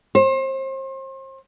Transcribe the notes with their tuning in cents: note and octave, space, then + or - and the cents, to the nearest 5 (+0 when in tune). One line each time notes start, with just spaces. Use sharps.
C5 +35